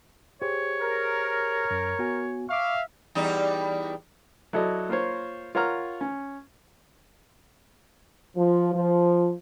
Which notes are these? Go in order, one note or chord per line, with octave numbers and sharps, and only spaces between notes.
G4 G#4 C5 C#5
A#4
F#2
B3 F#4 G#5
E5 F5 C#6 D6
E2 G3 D#4
F#3 E4 A4 D5 D#5
A#3 F4 A#4 C5 C#5
F4 A#4 C#5 F#5 A#5 F6
C#4
F3
F3